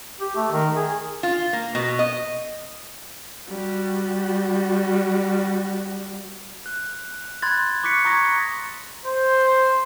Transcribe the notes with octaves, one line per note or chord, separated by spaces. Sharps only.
G4
A3
D#3
G#4
F4
A#3
B2
D#5
G3 F#4
F#6
B5 C6 F#6 G#6 A6
C#6 D6 F#6 B6 C#7
A#5 C#6 D#6 G#6 A#6
C5